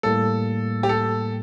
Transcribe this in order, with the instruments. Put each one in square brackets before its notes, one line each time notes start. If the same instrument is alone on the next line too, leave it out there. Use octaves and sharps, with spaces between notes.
[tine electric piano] A2 G3 A#3 [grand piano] A4
[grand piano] G4
A4